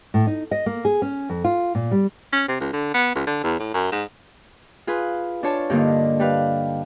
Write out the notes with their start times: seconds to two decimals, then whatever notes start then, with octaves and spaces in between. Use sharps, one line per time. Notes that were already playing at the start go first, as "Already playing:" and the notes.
0.14 A2
0.27 D#4
0.51 D#5
0.66 A#3
0.85 G#4
1.02 C#4
1.29 F2
1.44 F4
1.75 A#2
1.91 G3
2.33 C#4
2.48 C3
2.60 C#2
2.73 D3
2.94 B3
3.15 C#2
3.27 D3
3.44 E2
3.60 A2
3.74 F#2
3.92 G#2
4.87 F4 G#4 B4
5.43 D4 F4 C#5 A5
5.70 G2 D3 A#3 D#4
6.20 G3 B4 F5